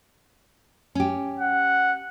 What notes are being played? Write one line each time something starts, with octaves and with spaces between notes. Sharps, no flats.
C#4 G4
F#5